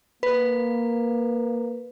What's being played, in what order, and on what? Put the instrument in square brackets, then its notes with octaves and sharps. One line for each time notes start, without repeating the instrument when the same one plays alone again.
[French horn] A#3 [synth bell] B4